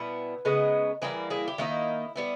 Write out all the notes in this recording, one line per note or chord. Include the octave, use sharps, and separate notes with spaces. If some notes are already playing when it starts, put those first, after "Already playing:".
Already playing: B2 G3 B3 E4 B4
C#3 G#3 B3 D#4
E3 G3 A#3 E4 G#4
E4 G#4
G4
D#3 A#3 D#4 E4
G3 B3 E4